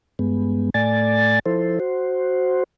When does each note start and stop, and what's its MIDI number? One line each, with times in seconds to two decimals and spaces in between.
0.19 0.70 43
0.19 0.70 56
0.19 0.70 59
0.74 1.39 45
0.74 1.39 57
0.74 1.39 74
0.74 1.39 80
0.74 1.39 93
1.46 1.79 53
1.46 1.79 64
1.46 1.79 69
1.46 1.79 72
1.80 2.64 66
1.80 2.64 72